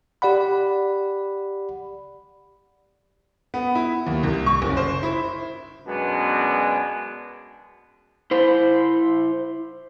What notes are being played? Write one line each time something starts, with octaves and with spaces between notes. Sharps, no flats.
G4 D5 F#5 B5
B3
E4
D#2
C2
C#6
F#1
C5
E4
F#2 B2 G#3 B3 D4
E4 C5